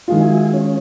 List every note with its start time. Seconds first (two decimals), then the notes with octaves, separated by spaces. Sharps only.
0.08 D#3 G#3 F4
0.21 F#4 E5 G#5
0.54 C#4 C#5